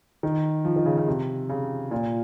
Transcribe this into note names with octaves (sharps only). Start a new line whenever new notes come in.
D#3
F3
D#3
C#3
C#3
C3
C#3
A#2